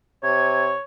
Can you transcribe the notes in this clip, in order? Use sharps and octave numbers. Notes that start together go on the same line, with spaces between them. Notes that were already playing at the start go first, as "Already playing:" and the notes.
C3 C#5 G#6